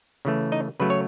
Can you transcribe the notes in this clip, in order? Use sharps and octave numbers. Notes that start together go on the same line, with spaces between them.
C#3 E3 A3
D#4 D#5
C#3 F#3 A3 B4
C#5